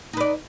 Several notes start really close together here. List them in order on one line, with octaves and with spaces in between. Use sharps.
D#4 B4 D5